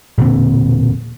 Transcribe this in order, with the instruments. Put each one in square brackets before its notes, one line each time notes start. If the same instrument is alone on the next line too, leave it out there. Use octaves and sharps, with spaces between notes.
[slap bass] E1 A#2 D3 C4